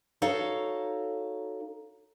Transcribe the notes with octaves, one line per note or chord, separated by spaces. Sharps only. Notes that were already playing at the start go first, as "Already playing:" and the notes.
D#4 F#4 A4 C#5 F5